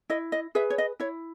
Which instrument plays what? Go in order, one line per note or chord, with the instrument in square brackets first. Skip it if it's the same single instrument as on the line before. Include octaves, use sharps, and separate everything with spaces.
[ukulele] E4 D#5
D#5
G#4 B4 E5
C#5
D#5
E4 C#5